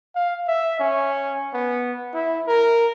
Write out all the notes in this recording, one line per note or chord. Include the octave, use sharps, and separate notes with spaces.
F5
E5
C#4
B3
E4
A#4